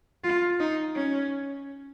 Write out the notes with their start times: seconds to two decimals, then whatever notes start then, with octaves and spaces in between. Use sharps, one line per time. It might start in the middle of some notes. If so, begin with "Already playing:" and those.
0.24 F4
0.59 D#4
0.96 C#4